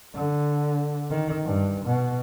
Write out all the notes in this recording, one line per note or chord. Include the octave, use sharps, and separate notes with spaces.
D3
D#3
G2
B2